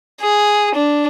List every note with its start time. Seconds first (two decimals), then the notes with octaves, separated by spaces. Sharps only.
0.21 G#4
0.75 D4